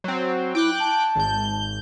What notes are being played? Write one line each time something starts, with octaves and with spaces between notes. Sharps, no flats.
F#3 C4
E4 G5 D6 F#6
A5
G#1 G6